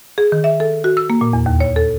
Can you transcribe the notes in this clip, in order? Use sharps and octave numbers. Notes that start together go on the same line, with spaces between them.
G#4
D#3
E5
A4
F#4
E6
A#3
A#2
E2
D#2
C#5
A4